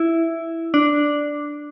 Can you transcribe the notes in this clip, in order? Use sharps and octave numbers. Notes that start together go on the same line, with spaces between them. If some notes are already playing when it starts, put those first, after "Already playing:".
Already playing: E4
D4